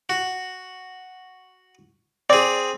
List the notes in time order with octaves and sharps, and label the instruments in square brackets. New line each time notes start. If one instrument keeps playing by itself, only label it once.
[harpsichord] F#4
[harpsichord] C4 G#4 [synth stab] D5